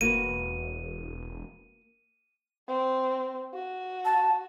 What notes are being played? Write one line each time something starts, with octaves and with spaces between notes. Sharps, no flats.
E1 A#3 F#4 B4 D#7
C4
F#4
A5